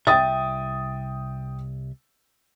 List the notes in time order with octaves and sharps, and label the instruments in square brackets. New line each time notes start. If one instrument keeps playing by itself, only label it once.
[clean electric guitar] C2 E5 [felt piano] G5 D#6 A6